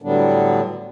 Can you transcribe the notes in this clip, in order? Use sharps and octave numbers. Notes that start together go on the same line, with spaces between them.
A2 D3 F#3 G3 B3 D4